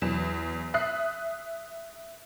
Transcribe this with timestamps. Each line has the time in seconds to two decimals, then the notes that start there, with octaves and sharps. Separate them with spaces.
0.02 E2 F#3 E7
0.74 E5 D#6 F#6 C7